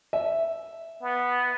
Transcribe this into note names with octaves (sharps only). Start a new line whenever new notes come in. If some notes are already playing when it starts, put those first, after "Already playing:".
E5
B3